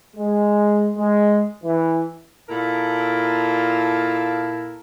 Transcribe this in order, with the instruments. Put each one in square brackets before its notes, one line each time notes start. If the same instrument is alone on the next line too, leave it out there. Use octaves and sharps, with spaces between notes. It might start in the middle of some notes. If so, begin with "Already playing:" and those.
[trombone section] G#3
G#3
E3
[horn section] A#2 E4 A4 A#4 F5 A5